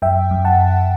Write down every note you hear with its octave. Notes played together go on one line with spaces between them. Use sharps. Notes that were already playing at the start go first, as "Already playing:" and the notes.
F#2 E5 G5
F#2
F#5 A5